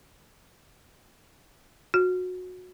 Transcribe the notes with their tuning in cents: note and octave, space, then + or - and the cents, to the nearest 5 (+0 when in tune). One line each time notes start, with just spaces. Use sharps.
F#4 -20